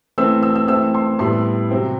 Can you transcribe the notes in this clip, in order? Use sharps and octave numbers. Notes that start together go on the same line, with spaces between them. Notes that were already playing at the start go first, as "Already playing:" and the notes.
E3 A3 C4 E6
E6
E6
E3 A3 C4 E6
C6
A2 G3 B3 C6
C3 F#3 C4